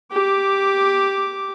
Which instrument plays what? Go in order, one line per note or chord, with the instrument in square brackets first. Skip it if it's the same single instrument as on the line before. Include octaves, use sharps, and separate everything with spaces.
[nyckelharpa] G4 D6